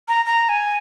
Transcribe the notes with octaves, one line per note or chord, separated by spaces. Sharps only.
A#5
A#5
G#5